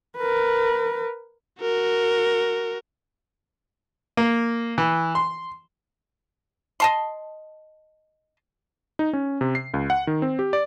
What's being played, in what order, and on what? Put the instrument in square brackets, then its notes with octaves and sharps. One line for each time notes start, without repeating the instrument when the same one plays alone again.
[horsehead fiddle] A#4 B4
[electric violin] F#4 A#4
[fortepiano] A#3
E3
C6
[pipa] D#5 A5 C6
[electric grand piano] D#4
C#4
C3
C7
C#2
F#5
D#3
C4
G4
D5